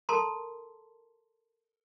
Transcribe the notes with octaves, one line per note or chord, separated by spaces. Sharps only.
A4 A#4 A5 A#5 C6